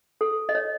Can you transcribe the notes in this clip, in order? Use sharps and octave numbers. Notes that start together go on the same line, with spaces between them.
A4
D#5
C#5